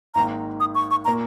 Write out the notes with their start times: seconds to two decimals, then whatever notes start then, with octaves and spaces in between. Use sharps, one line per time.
0.15 G#1 G#2 D#3 A#3 A#5
0.60 D#6
0.75 C#6
0.91 C#6
1.05 A#2 A#3 A#5